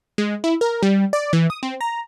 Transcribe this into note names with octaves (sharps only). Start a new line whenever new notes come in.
G#3
E4
A#4
G3
D5
E3
D#6
C4
A#5